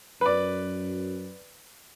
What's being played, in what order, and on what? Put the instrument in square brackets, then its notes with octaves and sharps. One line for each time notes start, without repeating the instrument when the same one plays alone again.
[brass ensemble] F#2 [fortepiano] B4 D5